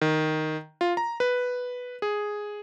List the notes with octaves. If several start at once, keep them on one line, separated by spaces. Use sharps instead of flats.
D#3
F4
A#5
B4
G#4